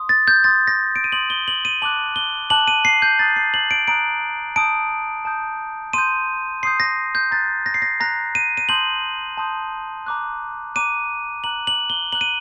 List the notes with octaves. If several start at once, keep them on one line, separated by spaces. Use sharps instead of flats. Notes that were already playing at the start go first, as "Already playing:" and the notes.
Already playing: C6 D#6
A6
G6
C6 D#6 G6 A6
A#6
D7
D#7
C6 D#6 G6 F#7
G7
F#7
D#7
A5 D6 F#6 F#7
G7
A5 D6 F#6 F#7
D#7
C7
G6
A#5 D#6 F#6 A6
C7
F#7
D7
A#5 D#6 F#6 D7
A5 D#6 G6 D7
A5 D#6 G6
C6 D#6 G6 D#7
C6 D#6 G6 C7
A#6
G6
A#5 F#6 A6
A#6
C7
A#6
A#5 F#6 A#6
D#7
D#7
A5 C6 D#6 G6 F#7
A5 C6 D#6 G6
A#5 D6 F#6
A#5 D6 F#6 D#7
A#5 F#6 F#7
F#7
G7
A#5 F#6 F#7
D#7